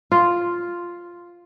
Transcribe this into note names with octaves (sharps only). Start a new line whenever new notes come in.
F4